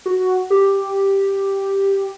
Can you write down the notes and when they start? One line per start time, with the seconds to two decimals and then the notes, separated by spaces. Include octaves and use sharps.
0.06 F#4
0.50 G4